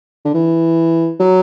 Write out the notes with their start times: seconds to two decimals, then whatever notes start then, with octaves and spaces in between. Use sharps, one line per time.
0.25 D3
0.34 E3
1.20 F#3